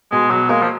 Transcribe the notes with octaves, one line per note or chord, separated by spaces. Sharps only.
B2 G#3
B2 F#3
G#3 A#3
F3